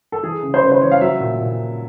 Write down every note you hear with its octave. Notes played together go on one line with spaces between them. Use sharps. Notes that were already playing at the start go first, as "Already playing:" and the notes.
A4
E3 G#4
C#3
C5
C#3 B4
C5
E3 C#5
F5
F#3 E5
A#2
A#2